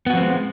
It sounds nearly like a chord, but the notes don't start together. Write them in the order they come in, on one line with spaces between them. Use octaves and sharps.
B3 F#4 F3 C4 G#3